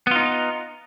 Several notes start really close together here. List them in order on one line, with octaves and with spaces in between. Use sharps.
B3 F4 D#4